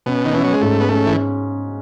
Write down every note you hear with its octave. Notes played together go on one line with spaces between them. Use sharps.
B2 C#4
D#3
E3 C#4
F#3
G#3
G#2 A3
B3
A3 C#4
E3